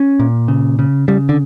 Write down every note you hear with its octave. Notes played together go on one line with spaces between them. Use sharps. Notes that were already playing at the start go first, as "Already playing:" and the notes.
Already playing: C#4
A#2
C#3
C#3
C#3 G3
D3